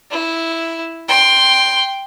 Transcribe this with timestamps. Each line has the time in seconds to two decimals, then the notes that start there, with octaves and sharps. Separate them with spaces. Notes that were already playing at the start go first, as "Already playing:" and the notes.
0.11 E4
1.08 G5 C6